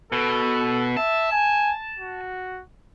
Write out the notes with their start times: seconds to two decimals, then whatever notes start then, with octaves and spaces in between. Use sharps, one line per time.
0.12 B2 A4
0.97 E5 A5
1.31 G#5
1.99 F#4